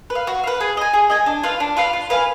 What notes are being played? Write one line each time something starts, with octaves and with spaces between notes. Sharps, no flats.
B4
F5
F#4
B4 F5
G#4
D#5 G#5
G#4
D#5 G#5
D4
F4 B4 F5
D4
F4 B4 F5
F4
B4 F5 G#5